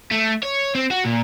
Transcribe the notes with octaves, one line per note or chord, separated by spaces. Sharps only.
A3
C#5
C4
F#4
A#2